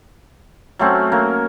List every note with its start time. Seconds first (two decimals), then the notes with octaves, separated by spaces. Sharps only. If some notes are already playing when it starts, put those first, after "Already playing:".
0.79 F#3 A3 C4 C#4
1.12 A#3 C#4 A#4